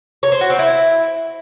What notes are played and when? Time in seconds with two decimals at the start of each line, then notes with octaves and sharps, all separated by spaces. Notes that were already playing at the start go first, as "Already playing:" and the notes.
0.23 C#5
0.32 C5
0.41 F#4
0.50 C4
0.59 E4